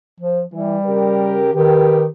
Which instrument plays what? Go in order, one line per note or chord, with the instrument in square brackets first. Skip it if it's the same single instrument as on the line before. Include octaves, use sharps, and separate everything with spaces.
[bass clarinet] F3
[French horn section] E3 [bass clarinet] G3
[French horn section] C#3 G4 A#4
[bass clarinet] D#3 [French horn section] G4 B4